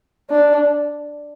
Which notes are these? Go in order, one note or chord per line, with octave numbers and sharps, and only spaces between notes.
D4